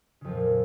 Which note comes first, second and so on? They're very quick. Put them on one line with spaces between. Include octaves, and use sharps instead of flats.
C#3 F2 F3 A#2